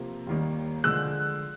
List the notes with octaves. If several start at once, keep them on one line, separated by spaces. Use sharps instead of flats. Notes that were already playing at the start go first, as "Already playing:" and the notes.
Already playing: C3 F3 A#3
D#2 D#3 G3 A#3
D3 F3 G#3 E6 F#6